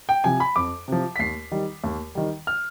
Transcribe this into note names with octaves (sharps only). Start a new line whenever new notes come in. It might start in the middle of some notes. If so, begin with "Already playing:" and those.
G5
C3 F3 G#5
B5
F2 D6
C3 F3
B6
D#2 C7
D#3 G3
D#2
D#3 G3
F6